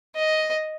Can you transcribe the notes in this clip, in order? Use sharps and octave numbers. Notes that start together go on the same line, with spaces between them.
D#5